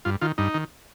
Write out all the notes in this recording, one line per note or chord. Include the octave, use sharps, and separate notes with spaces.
G2 F4
D#3 F4
G2 D#4
D#3